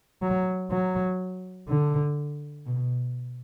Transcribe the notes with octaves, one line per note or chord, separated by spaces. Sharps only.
F#3
F#3
D3
B2